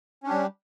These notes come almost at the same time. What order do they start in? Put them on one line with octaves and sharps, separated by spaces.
C#4 D4 G4 G3